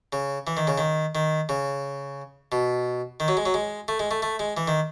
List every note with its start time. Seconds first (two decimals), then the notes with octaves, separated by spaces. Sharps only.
0.13 C#3
0.47 E3
0.57 D#3
0.67 C#3
0.78 D#3
1.15 D#3
1.49 C#3
2.52 B2
3.20 D#3
3.28 F#3
3.37 G#3
3.46 F#3
3.54 G#3
3.88 A3
4.00 G#3
4.11 A3
4.22 A3
4.39 G#3
4.57 E3
4.68 D#3